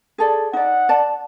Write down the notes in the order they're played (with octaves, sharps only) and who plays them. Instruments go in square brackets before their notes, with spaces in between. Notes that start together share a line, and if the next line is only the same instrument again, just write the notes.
[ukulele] G#4 A4 D5
[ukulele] D#4 D5 [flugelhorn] F#5
[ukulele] D5 A5